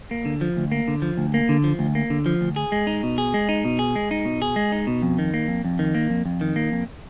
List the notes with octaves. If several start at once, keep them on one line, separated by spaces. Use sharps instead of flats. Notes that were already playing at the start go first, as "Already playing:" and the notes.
A#3
D3
F3
D2
A#3
D3
F3
D2
A#3
D3
F3
D2
A#3
D3
F3
D2
G#4
G#3
D#4
B2
G#4
G#3
D#4
B2
G#4
G#3
D#4
B2
G#4
G#3
D#4
B2
F2
D#3
A#3
F2
F2
D#3
A#3
F2
F2
D#3
A#3
F2